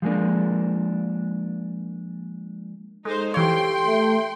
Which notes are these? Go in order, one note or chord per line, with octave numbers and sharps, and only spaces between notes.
F3 G3 G#3 A#3 D4
G#3 D#4 A4 C5
E3 G4 A4 C#5 F5 G5 C6
A3